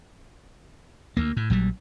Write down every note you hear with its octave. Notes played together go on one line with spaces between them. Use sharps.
D2 A#3
A2
A#1 F#3 G3